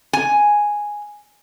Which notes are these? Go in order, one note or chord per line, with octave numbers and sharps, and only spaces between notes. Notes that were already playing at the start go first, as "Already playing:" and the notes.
G#5